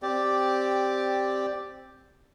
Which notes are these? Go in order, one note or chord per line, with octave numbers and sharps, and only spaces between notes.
C4 G4 D5